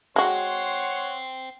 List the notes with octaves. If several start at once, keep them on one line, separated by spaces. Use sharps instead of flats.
G#3 F#4 C5 C#5 F#5 G5 C6